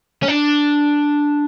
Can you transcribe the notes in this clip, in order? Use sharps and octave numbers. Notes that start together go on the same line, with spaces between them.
C#4
D4